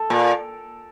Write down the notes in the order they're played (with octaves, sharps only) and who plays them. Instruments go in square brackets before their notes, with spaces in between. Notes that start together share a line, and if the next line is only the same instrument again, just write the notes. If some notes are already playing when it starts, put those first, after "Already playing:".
Already playing: [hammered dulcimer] A4
[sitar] A#2